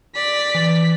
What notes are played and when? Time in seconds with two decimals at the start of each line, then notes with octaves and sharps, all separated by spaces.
0.15 D5 B6
0.55 E3